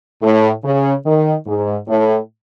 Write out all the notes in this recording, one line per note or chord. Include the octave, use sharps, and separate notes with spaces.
A2
C#3
D#3
G#2
A2